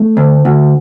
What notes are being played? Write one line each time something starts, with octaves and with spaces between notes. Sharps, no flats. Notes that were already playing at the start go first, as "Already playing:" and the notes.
Already playing: A3
D2
D2